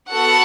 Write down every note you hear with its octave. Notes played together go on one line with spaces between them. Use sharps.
B3 F#4 A4 F#5